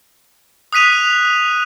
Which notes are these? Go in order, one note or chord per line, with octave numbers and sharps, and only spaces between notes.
D#6 F#6 B6 D#7 F7